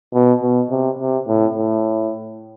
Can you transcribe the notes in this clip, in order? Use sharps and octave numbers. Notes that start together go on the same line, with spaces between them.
B2
B2
C3
C3
A2
A2